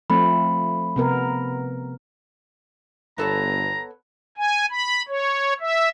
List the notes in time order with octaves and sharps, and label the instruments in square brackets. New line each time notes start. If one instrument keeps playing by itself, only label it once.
[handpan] F3 A3 C4 [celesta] B5
[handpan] C3 B3 A#4
[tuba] G1 [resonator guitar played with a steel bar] B3 A4 C#5 [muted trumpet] A#5
[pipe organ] G#5
B5
C#5
E5